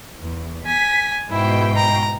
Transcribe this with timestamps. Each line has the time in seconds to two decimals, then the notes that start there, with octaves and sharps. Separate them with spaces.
0.20 E2
0.66 G#5 B6
1.30 G#2 B2 E4 G5
1.77 A#5